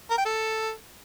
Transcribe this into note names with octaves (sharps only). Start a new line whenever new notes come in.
A#4
G5
A4